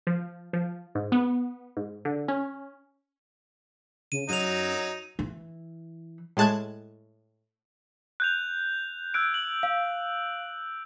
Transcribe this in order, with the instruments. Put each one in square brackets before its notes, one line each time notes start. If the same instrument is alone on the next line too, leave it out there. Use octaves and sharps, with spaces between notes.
[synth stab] F3
F3
G#2
B3
G#2
D3
C#4
[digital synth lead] C#3 [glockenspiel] D#7
[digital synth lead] F#2 [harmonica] F#3 D#4 [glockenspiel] D#7 F7
[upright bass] E3
[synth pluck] A2 G#3 A5 F#6 G#6
[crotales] F#6 G6 F7
[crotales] E6 F#6 D7 [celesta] G#6
[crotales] F#7
[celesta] F5